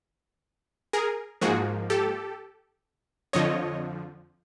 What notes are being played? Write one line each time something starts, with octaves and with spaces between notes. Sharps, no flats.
G#4 A#4
G#2 F3 A#3 F#4 G#4
G4 A4
F2 D3 F3 C#5 D#5